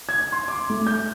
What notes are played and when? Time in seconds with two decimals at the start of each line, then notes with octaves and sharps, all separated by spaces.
0.09 G#6
0.32 C6
0.48 D6
0.70 A3
0.87 G6